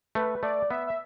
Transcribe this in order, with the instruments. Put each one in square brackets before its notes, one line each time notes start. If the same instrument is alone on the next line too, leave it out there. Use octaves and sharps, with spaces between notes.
[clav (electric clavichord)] A3 [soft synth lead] B4
[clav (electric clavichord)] A3 [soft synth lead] D5
[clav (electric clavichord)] B3 [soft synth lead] E5
[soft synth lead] E5